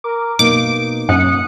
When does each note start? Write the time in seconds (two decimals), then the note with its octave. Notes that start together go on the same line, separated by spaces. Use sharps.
0.04 A#4 D6
0.39 B2 A#3 D#4 D6 D7
1.09 F#2 D#6 F#6 C#7